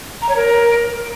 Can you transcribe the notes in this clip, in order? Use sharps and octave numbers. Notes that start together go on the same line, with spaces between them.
A#5
C#5
A#4